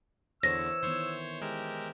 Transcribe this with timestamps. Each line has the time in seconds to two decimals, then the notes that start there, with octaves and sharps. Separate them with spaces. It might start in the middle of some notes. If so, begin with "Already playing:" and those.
0.43 E2 D3 E3 C5 C#5 E6 A#6
0.83 D#3 E3 B3 C5 C#5
1.42 G#3 G4 A#4 E6